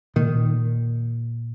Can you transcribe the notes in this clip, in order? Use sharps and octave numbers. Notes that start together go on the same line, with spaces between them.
A#2 D#3